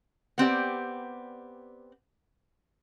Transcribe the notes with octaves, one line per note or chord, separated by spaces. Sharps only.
B3 C4 G4 D5